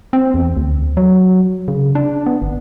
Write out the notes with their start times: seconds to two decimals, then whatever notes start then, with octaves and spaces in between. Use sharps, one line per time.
0.13 C4
0.34 E2
0.57 D2
0.97 F#3
1.68 C#3
1.95 D4
2.26 B3
2.42 G1